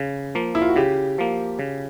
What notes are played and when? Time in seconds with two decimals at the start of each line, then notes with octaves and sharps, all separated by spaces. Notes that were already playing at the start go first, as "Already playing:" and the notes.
Already playing: C#3
0.35 F3 A#3
0.55 E4
0.62 F4
0.69 F#4
0.76 C#3 G4
1.18 F3 A#3
1.59 C#3